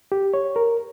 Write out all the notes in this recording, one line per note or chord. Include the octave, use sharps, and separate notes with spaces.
G4
C#5
A#4